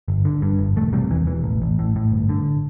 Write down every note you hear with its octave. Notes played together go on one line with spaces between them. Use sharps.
G1
D3
G2
G1
E1 A3
C3 G3
E2 E3
E1 E3
A1
A1
A2
A2
G1
D3